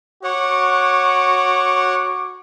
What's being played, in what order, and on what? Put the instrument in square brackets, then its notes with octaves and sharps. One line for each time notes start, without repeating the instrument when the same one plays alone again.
[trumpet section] F#4 C#6 D6 [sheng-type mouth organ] C#5 F#5